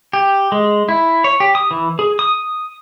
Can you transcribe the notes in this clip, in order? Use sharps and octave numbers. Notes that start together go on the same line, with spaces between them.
G4
G#3
E4
C#5
G4
D#6
E3
G#4
D#6